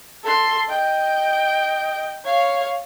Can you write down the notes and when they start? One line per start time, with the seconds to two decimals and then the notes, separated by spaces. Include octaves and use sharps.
0.24 A4 C6
0.69 D#5 G5
2.24 C#5 F5